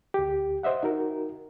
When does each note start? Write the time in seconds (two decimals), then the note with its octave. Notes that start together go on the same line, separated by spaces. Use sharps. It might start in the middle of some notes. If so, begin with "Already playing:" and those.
0.14 D2 G4
0.63 C5 D#5 E5 F#5
0.83 D#4 F#4 A#4